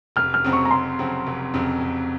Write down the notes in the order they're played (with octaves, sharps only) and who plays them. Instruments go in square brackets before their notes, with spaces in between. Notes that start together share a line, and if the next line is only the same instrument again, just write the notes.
[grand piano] F1 [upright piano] F6
[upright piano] F6
[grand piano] F2 C#3 F#3 C4
[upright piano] C#6
A#5
[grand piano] F1 [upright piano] C6
[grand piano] F2 C#3 F#3 C4
F1
F2 C#3 F#3 C4
F1